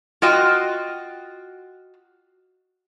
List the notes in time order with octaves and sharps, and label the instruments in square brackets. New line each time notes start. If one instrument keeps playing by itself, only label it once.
[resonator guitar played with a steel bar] F4 F#4 D#5 G5